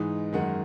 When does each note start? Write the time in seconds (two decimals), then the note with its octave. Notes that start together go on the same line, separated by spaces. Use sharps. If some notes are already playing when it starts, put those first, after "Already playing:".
Already playing: G#2 E3 G#3 D#4
0.33 F#2 D#3 G#3 F#5